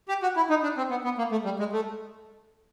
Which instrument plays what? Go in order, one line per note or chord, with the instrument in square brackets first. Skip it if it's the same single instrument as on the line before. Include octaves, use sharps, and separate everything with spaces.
[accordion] G4
F#4
E4
D#4
D4
C4
B3
B3
A#3
A3
G3
G#3
A3